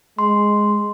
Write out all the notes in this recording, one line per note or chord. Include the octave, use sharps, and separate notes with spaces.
G#3 C6